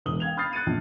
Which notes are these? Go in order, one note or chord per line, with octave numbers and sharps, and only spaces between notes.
E1 B4 D#6 F#7 G7
F5 G5 G#6 F7
B5 D#6 F6 G6 A6 C7
F#6 A6 C#7 D#7
A#1